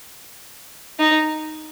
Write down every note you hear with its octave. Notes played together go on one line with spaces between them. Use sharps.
D#4